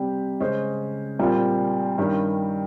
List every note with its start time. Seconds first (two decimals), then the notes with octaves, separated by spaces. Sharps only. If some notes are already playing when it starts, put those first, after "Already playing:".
Already playing: C3 G3 C4 G4
0.40 C#3 G#3 C#4 G#4 C5
1.19 A#2 G3 C4 F4
1.98 G2 D#3 G3 C#4 G4